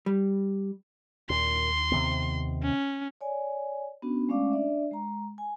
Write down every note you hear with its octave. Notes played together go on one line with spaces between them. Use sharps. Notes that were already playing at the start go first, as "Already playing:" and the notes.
G3
D#2 A#2 C6
C3 D#3 B3
C#4
C#5 D5 G#5
B3 C#4 D4 F#4
G#3 A3 C#4 D5 F5 D6
D4 D5 E5
G#3 A#5
G#5